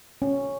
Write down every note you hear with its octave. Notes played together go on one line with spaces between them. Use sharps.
C#4